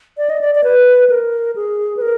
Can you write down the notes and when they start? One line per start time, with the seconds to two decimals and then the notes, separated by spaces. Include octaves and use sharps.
0.18 D5
0.30 D#5
0.41 D5
0.55 D5
0.64 B4
1.10 A#4
1.56 G#4
1.97 B4
2.02 A#4